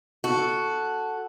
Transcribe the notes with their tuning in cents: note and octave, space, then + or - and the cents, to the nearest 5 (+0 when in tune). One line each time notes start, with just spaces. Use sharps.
F#4 +0 A4 +0